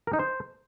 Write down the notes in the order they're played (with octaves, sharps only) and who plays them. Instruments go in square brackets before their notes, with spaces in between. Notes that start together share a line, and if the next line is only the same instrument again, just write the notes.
[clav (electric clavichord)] A#4
D#4
C5